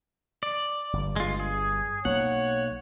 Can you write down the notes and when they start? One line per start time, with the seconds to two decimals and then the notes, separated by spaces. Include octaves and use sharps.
0.43 D5
0.93 G1 G2
1.16 G#3 F4
1.40 G#4
2.05 B1 A#3 C#5 F#5